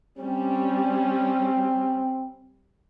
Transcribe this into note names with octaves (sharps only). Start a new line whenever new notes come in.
G3 C4 C#4